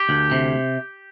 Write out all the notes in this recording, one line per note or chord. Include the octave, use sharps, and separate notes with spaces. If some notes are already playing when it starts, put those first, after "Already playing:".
Already playing: G4
D2
C3